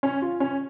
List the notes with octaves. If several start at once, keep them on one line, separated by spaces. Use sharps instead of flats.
C#4
F4
C#4